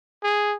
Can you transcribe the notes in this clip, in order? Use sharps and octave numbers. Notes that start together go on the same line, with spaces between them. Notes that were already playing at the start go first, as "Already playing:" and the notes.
G#4